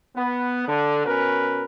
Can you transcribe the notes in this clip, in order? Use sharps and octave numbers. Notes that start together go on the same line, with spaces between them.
B3
D3
B2 C#4 A#4 B4